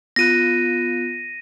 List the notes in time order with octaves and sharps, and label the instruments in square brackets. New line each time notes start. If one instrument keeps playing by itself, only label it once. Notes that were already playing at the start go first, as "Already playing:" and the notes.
[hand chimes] B3 F4 F#6 [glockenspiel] A#6 D#7